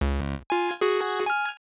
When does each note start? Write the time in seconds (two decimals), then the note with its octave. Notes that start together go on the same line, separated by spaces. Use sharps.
0.01 C#2
0.50 F4 G#5
0.81 F#4 G#4
1.26 G#5 F6